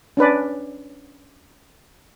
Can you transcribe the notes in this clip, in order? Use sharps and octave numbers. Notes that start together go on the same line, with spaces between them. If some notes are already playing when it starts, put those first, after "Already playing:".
C#4 D4 B4 D5